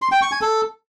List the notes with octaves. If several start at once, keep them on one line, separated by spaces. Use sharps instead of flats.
C6
G5
C#6
G#5
A4